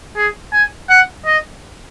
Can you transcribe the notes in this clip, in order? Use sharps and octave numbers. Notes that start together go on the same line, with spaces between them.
G#4
G#5
F#5
D#5